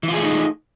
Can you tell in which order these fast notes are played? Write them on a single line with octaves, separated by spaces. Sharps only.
E3 F4 G#4 A3 D#4